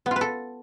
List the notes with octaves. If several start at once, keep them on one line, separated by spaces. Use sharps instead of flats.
B3
F4
B4
A4